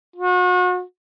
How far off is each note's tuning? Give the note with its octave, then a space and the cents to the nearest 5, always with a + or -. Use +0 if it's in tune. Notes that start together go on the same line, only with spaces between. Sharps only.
F#4 -40